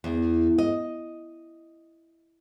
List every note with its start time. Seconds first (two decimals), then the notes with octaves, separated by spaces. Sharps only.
0.04 E2
0.58 D#5